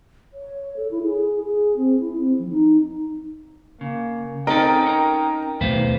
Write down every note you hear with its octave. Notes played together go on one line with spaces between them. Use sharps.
C#5
A4
E4
G#4
G#4
C4
E4
C4
F3
D#4
C#3 A#3
C4 C#4 D#4 A4 A#4 G5
C#4 F#5 A#5
D#2 B2 A3 B4 C5 F5